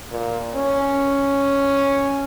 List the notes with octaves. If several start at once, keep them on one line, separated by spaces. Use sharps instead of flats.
A#2
C#4